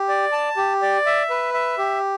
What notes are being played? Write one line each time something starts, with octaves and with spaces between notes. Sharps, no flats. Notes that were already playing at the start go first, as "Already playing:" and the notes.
Already playing: G4
D5
A5
G4
D5
E5
B4
E5
G4